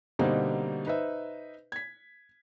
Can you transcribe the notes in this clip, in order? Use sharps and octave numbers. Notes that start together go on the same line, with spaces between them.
B2 D3 G3 A#3 C4 D#4
D#4 B4 C5 E5
G#6 B6